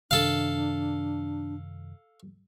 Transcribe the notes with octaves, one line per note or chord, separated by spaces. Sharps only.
F#2 C3 D#3 D4 A4 F5